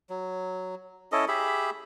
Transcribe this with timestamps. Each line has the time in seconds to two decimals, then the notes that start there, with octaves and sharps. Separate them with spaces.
0.10 F#3
1.12 C#4 E4 A4 D#5
1.28 G4 G#4 E5 B5